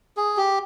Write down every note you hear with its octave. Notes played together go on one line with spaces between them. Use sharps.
G#4
G4